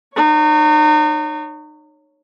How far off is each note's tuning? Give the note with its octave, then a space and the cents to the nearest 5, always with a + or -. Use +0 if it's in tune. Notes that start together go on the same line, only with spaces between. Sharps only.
D#4 -35 C#5 +0